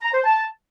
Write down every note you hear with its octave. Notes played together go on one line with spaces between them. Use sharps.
A#5
C5
A5